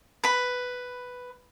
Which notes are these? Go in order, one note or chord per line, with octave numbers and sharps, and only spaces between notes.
B4 B5